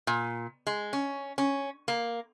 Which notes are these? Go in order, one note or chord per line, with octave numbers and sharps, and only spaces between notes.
A#2
G#3
C#4
C#4
A#3